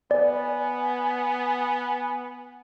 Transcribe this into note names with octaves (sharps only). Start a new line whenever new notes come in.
B3 D5 G#5